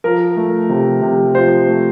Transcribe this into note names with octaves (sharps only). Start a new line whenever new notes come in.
F3 A#4
A3
C3
C3
F3 C5
A3